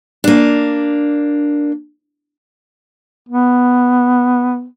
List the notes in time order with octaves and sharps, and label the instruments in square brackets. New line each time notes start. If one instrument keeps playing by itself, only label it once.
[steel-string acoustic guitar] A#3 D4
[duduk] B3